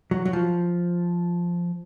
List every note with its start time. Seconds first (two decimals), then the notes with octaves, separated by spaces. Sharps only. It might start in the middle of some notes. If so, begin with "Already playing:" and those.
0.11 F#3
0.25 F#3
0.33 F3